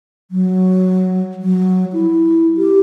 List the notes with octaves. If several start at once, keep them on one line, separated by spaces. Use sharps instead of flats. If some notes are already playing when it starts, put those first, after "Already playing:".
F#3
F#3
E4
G4